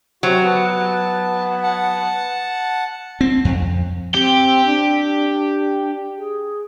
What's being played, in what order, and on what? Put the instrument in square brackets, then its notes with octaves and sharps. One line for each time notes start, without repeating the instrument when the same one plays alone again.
[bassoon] C3 [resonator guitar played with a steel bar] F#3 [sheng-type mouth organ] F#4
[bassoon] B3 [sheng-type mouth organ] A5
[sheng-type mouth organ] F#5 A5
[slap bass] C4
F2
[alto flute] C4 [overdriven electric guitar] G4
[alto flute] D4
G#4